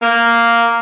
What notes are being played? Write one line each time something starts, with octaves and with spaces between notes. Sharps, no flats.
A#3